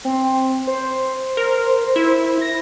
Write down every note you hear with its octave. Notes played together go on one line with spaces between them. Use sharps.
C4
C5
A#4
E4
A#6